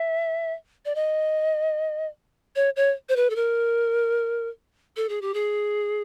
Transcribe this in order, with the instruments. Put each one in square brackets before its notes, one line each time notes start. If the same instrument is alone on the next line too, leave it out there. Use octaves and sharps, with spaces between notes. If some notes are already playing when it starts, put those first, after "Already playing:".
Already playing: [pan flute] E5
D5
D#5
C#5
C#5
C5
B4
A4
A#4
A4
G#4
G4
G#4